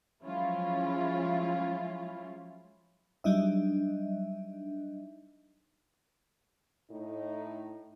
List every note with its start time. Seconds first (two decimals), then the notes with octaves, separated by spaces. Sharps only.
0.24 F3 F#3 G#3 C#4 E4 F4
3.24 F#3 G3 D4 D#4 D#5 E5
6.91 A2 D#4